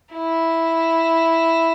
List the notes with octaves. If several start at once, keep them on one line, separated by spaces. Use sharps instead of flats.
E4